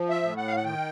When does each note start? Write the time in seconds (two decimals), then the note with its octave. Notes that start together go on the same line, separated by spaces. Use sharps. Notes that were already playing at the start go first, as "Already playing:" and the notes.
Already playing: F3
0.09 E5
0.23 A2
0.37 F#5
0.47 F5
0.56 F#5
0.64 D#3 G5